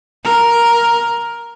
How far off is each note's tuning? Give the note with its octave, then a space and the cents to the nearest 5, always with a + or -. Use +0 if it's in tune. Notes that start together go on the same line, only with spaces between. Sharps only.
A#4 +5